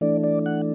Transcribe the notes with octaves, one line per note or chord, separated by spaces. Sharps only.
E3 A3 D4 D5
D5
F#5